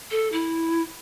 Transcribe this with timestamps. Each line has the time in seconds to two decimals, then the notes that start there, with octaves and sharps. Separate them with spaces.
0.11 A4
0.32 E4